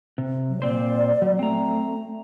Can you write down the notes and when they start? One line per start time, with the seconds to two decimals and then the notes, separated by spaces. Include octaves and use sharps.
0.18 C3
0.49 F#3
0.62 A#2 C4 C5 D5
1.22 F#3
1.39 A3 C4 A#5